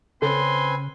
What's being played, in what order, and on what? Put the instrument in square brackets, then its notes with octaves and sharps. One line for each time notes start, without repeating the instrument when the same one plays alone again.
[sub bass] C#3 [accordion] C4 B4 G#5 [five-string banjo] C#4 A4 [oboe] C6